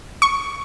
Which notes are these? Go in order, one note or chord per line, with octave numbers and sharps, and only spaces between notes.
C#6